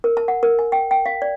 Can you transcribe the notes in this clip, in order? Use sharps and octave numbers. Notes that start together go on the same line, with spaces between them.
A#4
A5
F#5
A#4
G#5
G5
G5
F5
D5